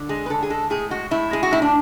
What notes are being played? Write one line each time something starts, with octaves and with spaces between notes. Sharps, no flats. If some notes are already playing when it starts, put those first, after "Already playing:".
Already playing: D3
G#3 G#4
B4
D3 A4
G#4
G#3 A4
A2 G#4
G#3 F#4
A2 E4
G#3 G#4
F#4
A2 E4
D4